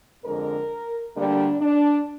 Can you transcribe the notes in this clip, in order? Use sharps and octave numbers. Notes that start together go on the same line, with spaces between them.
F2 D3 G#3 A#4
D2 D3 G3 A#3 D4
D4